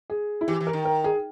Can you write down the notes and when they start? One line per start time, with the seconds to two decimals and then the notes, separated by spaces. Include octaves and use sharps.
0.10 G#4
0.41 E4
0.48 E3 G4
0.61 E3
0.67 A#4
0.73 D#3
0.85 A#4
1.04 G#4